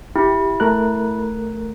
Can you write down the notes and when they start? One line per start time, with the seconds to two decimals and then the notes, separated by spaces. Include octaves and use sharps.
0.16 E4 G4
0.60 A3 A#4 F#6